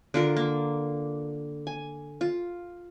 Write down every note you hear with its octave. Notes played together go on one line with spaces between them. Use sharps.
D3 F4 A#4
A#3
G#5
F4